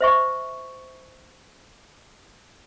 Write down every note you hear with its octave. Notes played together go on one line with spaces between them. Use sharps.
C5 E5 C#6